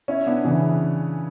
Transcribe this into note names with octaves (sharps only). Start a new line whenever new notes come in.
C#4 E4
B3 D4
C#3 E3